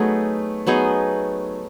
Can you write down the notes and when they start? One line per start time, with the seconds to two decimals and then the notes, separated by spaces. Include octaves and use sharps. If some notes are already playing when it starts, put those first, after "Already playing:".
Already playing: F#3 A3 B3 D#4 G#4
0.67 F#3 B3 D#4 G#4